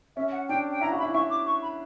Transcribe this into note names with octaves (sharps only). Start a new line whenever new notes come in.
C#4 E5
F#5
D4 G5
G5
E4 A#5
F#4
B5
E4
E4 C#6
D6
C#6
B5